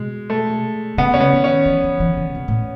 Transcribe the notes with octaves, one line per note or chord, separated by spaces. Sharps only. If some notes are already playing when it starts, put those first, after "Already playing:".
Already playing: B2 G#3
A3
C#3 B3
C#4
B3
D#3
C#4
E3
E3
E3
C#3
B2
A2